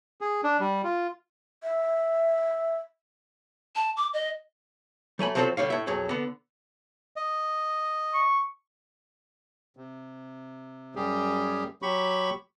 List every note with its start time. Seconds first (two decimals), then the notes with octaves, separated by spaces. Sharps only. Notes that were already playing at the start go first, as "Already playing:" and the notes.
0.21 G#4
0.44 D4
0.60 G3
0.84 F4
1.63 E5
3.76 A5
3.97 D6
4.14 D#5
5.19 F#3 A3 G#5 B5
5.35 F3 F#3 C4 F#4 A4 C5
5.57 D3 G3 C#5 F5
5.70 A2 E5
5.87 B1 F2 F#3 G#4
6.09 D3 B3
7.16 D#5
8.14 C#6
9.77 C3
10.96 F#2 G3 G4 G#4
11.82 F#3 G4 B5 C#6